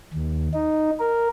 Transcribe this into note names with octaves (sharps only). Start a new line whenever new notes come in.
D#2
D#4
A#4